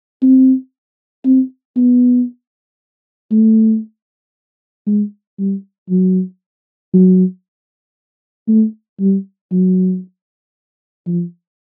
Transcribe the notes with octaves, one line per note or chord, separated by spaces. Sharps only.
C4
C4
B3
A3
G#3
G3
F#3
F#3
A3
G3
F#3
F3